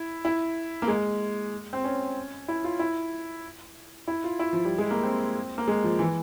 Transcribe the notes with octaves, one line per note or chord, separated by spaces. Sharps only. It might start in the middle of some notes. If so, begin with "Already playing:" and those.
Already playing: E4
E4
A#3
G#3
C4
C#4
E4
F4
E4
E4
F4
E4
F3
G3
G#3
A#3
C4
A#3
G#3
F3
E3